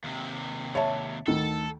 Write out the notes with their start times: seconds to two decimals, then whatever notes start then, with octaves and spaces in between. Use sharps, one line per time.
0.04 D#2 C3
0.75 C#5 E5 A5
1.27 D2 D#3 A4